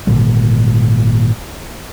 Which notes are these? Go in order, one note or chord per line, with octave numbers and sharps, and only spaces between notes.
G#1 A#2 D3 G3